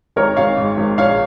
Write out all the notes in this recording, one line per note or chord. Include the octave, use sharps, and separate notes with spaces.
G#1 A#4 C#5
G#1 C#5 F5
G#2
G#1
A#1 C#5 F5